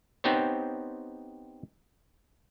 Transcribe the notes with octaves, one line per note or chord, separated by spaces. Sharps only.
B3 C4 D#4 G4 C5 C#5